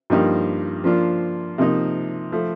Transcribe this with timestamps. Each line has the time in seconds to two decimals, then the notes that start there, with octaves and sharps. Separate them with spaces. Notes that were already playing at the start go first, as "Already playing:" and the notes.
0.10 G2 F3 A#3 D#4 G4
0.84 F3 A#3 D4 F4
1.58 C3 F3 A#3 D#4
2.32 F3 A3